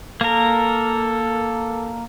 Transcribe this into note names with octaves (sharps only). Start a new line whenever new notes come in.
A#3 A4 A#4